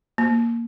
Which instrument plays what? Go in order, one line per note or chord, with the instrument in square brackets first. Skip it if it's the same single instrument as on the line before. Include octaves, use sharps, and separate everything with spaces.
[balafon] A#3